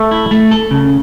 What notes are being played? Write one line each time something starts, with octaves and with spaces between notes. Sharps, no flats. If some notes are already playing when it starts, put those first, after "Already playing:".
Already playing: A3
E4
A3
A4
C#3